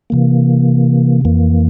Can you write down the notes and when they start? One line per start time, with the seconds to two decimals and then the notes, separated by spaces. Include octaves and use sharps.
0.10 C3 E3 A#3
1.25 F2 E3 A#3